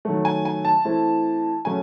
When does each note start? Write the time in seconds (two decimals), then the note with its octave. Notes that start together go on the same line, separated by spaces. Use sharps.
0.05 D#3 F#3 A3
0.25 G#5
0.45 G#5
0.65 A5
0.85 E3 A3 C4 E4
1.65 C#3 F#3 A3 C#4 G#5